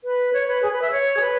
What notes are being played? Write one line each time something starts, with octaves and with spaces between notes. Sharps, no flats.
B4
C#5
B4
G#4
B4
E5
C#5
G#4
B4